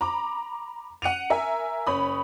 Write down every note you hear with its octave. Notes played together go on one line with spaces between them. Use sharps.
A#5 B5 D6
F#5 C#7 D#7 F7
A#4 E5 G#5
F#1 C#5 B5 D#6